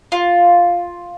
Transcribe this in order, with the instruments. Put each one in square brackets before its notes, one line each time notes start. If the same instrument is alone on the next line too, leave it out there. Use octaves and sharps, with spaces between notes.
[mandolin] F4